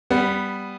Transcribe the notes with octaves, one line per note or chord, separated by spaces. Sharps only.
G3 B3